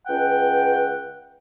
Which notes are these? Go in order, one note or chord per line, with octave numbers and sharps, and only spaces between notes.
C#2 B4 F#5 G5